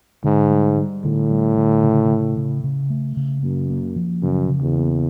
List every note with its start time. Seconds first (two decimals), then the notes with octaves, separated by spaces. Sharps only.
0.24 G#2 D3
0.51 G3
0.78 G3
1.04 A2 D3
1.31 G3
1.57 D3
1.84 C#3
2.10 C#3
2.37 C#3
2.64 C#3
2.90 A3
3.17 C#3
3.43 F#2 A#3
3.70 A#3
3.96 F3
4.22 F#2 C#3
4.49 C#3
4.62 E2
4.76 A#3